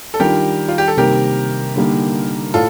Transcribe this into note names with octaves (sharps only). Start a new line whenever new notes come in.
A4
D#3 G3 D4 F4 G4 A#4
F4
G4
A4
C3 D#3 G3 A#3 G4 A#4
D3 G3 A#3 D#4
A2 F4 A4